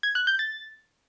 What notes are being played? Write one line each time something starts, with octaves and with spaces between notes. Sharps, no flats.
G#6
F#6
G6
A6